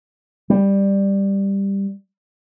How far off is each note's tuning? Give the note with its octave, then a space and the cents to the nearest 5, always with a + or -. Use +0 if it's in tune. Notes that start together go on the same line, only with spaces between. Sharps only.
G3 +10